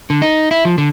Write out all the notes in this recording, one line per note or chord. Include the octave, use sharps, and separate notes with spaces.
D3
D#4
E4
F3
D3